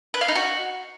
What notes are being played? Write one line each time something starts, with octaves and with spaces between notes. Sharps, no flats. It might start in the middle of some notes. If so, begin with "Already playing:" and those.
B4
F5
D#4
F#4